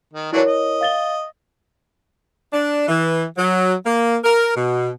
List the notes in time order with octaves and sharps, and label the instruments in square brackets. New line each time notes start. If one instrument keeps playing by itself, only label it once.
[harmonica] D#3
[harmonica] E3 F#3 D4 [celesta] E4 A#4 C#5
[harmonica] D#5
[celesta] F5 A6 G7
[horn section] D4
E3
F#3
A#3
A#4
B2